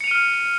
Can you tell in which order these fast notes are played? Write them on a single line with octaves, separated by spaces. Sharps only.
C#7 F7 D#7 F6